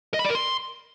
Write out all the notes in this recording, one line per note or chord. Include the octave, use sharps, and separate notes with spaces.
D#5
B5
D5
A#4
C6